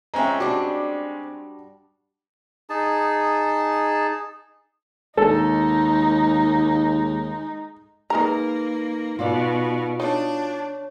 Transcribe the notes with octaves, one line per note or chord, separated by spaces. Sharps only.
G#3 C4 C#4 E5 G5 A#5
G3 D4 F#4 D6
D#4 G#4 A5
D#2 G#3 D#4 A4
G#3 A#3 D#4 A#4 B4 A#5
B2 F4 F#4 D5
D4 D#4 C#5